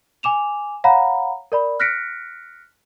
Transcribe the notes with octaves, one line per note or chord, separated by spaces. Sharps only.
G#5 D6 E7 F7
C#5 F5 F#5 A#5 B5
A#4 D5 B5
F6 F#6 A#6 B6 C#7 D7